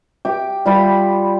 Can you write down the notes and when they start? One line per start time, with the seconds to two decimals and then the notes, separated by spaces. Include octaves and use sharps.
0.25 G4 D6
0.65 G3 F4 B5